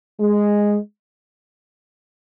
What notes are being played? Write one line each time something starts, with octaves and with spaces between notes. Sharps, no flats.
G#3